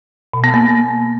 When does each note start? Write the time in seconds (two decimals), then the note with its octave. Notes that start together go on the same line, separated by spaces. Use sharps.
0.34 B2
0.44 B3
0.54 A#3